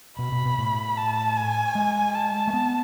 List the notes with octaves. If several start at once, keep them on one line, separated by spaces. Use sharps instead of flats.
B2 B5
B2
B2
A2
A5
G#5
G#3
A5
A3
B3